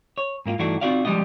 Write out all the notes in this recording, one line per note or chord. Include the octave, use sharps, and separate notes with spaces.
C#5
G#2 A#3 E4 F4
G2 E3 A3 D4 D#4 F#4
C4 D#4 F4 F#4 D5 F5
F3 G3 G#3 D4 D#5